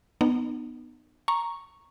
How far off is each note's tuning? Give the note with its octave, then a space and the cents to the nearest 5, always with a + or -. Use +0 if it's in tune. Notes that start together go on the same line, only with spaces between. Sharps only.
B3 +0 D#4 -35
A#5 +0 C#6 -5